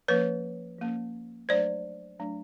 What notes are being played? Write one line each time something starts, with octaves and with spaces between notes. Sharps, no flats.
F3 A#3 C#4 B4 C#5
F3 A#3 C#4
F#3 A3 D4 C5 D5
F#3 A3 D4